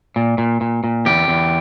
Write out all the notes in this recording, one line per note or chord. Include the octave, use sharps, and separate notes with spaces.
A#2
A#2
A#2
A#2
E2 G4
E2